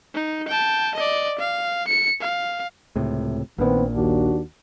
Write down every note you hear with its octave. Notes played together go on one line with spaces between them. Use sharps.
D#4
G5 A5
D5 D#5
F5
C#7
F5
C#2 A2 C3
A#1 A#2 D#3 B3 C4
D#2 D4 F#4